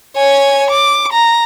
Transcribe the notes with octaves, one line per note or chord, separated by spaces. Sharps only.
C#5 G#5
D6
A#5